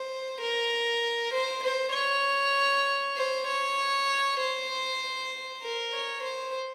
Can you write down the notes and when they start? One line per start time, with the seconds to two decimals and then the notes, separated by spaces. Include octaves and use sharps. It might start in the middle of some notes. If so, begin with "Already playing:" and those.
Already playing: C5
0.41 A#4
1.33 C5
1.63 C5
1.94 C#5
3.17 C5
3.48 C#5
4.39 C5
5.62 A#4
5.93 C#5
6.23 C5